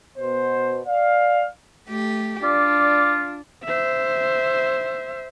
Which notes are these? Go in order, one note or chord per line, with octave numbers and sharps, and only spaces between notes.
B2 C5
D5 F5
A3 G4
D4 F4 D5
C5 E5